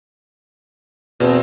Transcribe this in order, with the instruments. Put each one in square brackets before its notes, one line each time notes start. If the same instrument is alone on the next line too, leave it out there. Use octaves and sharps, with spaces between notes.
[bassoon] E2 [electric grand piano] B2 C4